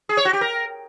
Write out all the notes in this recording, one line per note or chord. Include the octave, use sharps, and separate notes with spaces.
G#4
C#5
F#4
G4
A#4